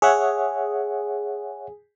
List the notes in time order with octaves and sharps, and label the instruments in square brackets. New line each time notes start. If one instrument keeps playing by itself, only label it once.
[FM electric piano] G#4 [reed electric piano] C#5 E5 F#5